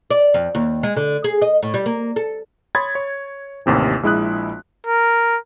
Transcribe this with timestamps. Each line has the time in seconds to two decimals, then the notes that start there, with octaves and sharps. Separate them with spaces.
0.10 D5
0.34 F2
0.55 D#2
0.83 G#3
0.97 D3
1.24 G#4
1.42 D#5
1.63 A2
1.74 G3
1.86 A#3
2.16 A4
2.75 C#5 B5 C6 D#6 G#6 A6
2.95 C#5
3.66 A1 D#2 C3 E3
4.03 A#1 G#3 E4 D#6 F#6
4.86 A#4